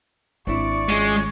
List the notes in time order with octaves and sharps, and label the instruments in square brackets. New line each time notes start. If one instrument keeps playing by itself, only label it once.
[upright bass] G#1 [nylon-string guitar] C4 D4 E4 [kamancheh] D5 C#6
[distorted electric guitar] G#3 [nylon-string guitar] C#4 F4 G#4